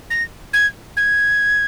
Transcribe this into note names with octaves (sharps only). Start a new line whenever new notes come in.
A#6
G#6
G#6